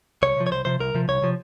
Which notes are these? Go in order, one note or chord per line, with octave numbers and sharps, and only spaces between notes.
C2 C#5
C3 F3
C#5
C2 C5
C3 F3 C5
C2 A#4
C3 F3
C2 C#5
C3 F3